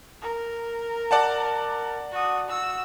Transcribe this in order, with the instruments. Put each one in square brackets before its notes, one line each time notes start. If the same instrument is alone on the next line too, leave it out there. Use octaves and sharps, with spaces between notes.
[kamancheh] A#4
[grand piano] D5 F#5 A5
[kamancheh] F#4 D#6
F#4 E6